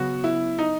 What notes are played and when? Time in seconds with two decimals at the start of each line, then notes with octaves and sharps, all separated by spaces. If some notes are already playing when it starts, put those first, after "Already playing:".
Already playing: C#3 F#3 B3 F#4
0.24 E4
0.59 D#4